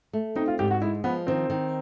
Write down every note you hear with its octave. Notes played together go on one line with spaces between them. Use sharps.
A3
C4 D#4
F4
G#2 G4
F#4
G#3 E4
F3 B3
D#3 C4
D#3